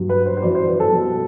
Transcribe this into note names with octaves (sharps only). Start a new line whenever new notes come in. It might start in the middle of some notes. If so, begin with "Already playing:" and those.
Already playing: G2 F#3
B4
C5
C5
F#2 E3 G3 D5
C5
B4
A4
B2 G3